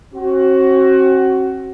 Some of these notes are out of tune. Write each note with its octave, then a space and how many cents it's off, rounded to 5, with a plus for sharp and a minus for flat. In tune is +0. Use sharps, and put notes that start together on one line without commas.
C4 +45 F#4 +20